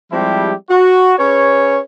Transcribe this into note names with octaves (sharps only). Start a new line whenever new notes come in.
F3 G3 G#3 C4 E4 G4
F#4
C#4 G#4 B4 C#5